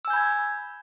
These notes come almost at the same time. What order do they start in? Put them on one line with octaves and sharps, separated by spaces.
E6 G#5 G6 B5 G#6